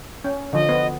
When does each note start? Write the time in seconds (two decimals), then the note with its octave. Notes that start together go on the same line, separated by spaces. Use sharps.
0.25 C#4
0.53 D3 F3 D#5
0.69 B3